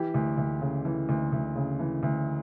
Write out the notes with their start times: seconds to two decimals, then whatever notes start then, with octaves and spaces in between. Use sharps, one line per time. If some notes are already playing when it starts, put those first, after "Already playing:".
Already playing: E3 G4
0.14 D2
0.38 D2
0.61 C#3
0.85 E3
1.09 D2
1.32 D2
1.55 C#3
1.79 E3
2.03 D2